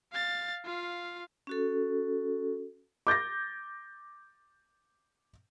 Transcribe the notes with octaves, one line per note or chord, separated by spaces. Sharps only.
F5 A6
F4 F5
C#4 F#4 A4
D6 G6 A6 A#6